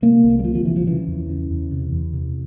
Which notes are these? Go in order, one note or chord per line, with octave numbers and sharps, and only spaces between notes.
C3 A#3
C2
G3
C3 F3
F3
C2 E3
F3
C#3 E3
E2
C#3
E2
C3
E2
C3